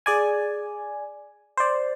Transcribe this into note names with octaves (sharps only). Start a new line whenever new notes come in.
G#4 D5 G#5
C5 D5